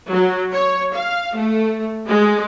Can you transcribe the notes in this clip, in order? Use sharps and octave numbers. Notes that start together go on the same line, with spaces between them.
F#3
C#5
F5
A3
G#3